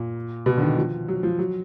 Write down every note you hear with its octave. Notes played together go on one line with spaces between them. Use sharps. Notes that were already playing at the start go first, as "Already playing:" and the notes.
Already playing: A#2
B2
D3
D#3
F3
F#3
F3
F#3